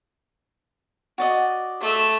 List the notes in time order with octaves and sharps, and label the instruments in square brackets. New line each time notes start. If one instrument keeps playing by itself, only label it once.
[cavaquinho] F#4 D5 D#5
[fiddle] A3 E6